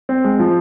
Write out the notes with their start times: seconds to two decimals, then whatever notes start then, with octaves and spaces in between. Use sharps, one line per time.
0.09 C4
0.24 G#3
0.39 F3